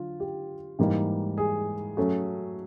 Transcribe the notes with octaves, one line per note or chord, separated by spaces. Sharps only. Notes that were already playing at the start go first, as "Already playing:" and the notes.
Already playing: D3 F#3 D4 F4
G4
G#2 E3 G3 A#3 D#4
G#4
F#3 A3 C#4 F#4